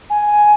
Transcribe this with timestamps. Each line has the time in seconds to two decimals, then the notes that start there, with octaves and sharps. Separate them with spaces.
0.10 G#5